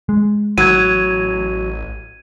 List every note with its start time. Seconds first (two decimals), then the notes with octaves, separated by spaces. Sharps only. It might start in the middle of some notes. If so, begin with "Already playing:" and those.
0.09 G#3
0.58 A1 F#3 G#6 D#7